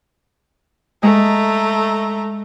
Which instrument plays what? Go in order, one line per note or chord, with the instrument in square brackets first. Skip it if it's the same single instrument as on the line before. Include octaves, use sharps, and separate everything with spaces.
[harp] G#3 [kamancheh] A3 A#5